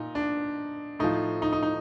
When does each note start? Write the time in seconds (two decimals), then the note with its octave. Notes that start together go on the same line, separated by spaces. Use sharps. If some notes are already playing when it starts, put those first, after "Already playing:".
Already playing: A#2 D#4
0.15 D4
0.99 A2 F3 D#4
1.42 D#4
1.52 D#4
1.63 D#4